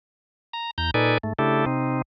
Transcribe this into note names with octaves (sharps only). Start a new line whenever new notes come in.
A#5
E2 A#5 G6
A#2 D#4 A4 B4 D5 G#5
G#2 A3
C#3 A3 D4 E4 G4 A4
C3 C4 D#4